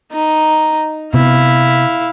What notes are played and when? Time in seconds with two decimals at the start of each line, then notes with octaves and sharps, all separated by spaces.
0.12 D#4
1.14 C3 B3 E4 F5